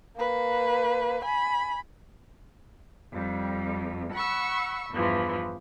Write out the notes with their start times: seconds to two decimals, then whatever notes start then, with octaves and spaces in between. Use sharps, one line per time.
0.16 A#3 B4
1.25 G#5 B5
3.12 F2 G3
4.13 F#5 B5 C#6 E6
4.90 E2 G2 E3 F3